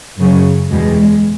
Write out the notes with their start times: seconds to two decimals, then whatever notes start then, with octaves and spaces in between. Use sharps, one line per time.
0.18 F#2 C#3 F#3
0.70 E2 B2 G3 G#3